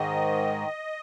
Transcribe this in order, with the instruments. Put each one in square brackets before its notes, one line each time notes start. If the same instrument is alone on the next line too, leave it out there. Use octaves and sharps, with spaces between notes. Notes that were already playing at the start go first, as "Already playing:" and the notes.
Already playing: [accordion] G#2 D#3 D#5